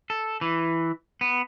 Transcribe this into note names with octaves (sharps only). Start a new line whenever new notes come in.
A4
E3
B3